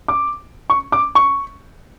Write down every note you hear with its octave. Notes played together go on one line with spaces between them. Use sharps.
D6
C#6
D6
C#6